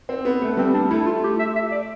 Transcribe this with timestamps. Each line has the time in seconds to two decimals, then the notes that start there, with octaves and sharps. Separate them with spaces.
0.09 C4
0.25 B3
0.42 A3
0.57 G3 C4
0.74 D4
0.90 A3 E4
1.06 F4
1.24 G4
1.39 E5
1.55 E5
1.72 D5